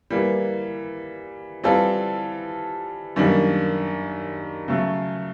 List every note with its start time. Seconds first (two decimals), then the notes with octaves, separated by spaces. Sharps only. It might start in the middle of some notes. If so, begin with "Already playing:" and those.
0.10 E3 G3 A#3
1.64 E3 G3 C4 F4 A4
3.16 F#2 D#3 G3 A#3 D4
4.68 C#3 F#3 A3